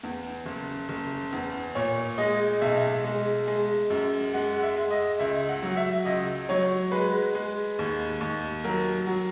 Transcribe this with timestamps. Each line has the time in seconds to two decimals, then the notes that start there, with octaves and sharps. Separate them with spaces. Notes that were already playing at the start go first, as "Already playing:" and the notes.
0.03 E2
0.46 F#1
0.89 F#1
1.32 E2
1.75 A#2 C#5
2.18 G#3 D#5
2.61 B1 E5
3.04 G#3
3.47 G#3
3.90 F#2
4.34 G#3 F#5
4.63 E5
4.76 G#3
4.91 D#5
5.19 C#2 E5
5.49 F#5
5.62 F#3
5.77 E5
6.05 C#2 D#5
6.49 F#3 C#5
6.91 G#3 B4
7.35 G#3
7.79 D#2
8.21 D#2
8.64 F#3 A#4
9.07 F#3